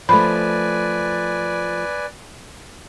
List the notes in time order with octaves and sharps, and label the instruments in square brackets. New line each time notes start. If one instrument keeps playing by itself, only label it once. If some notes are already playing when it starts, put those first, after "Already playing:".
[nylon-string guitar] F3 A3 [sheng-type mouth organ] B4 D5 G#5 [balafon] B5